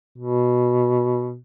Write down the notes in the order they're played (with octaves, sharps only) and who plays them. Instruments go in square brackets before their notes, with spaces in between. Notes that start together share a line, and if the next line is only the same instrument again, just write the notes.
[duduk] B2